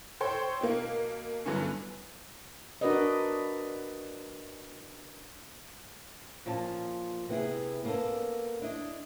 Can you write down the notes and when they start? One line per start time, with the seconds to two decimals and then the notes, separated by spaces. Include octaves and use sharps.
0.20 A4 C5 C#5 G5 C6
0.61 B2 A#3
1.46 G2 D3 F#3 B3 C#4
2.81 D4 F#4 A#4 B4 D5 D#5
6.46 A#2 F3 C#4 A5
7.29 C3 B3 E4 G#4
7.85 A#3 B3 C#4 A4
8.62 D4 E4 D#5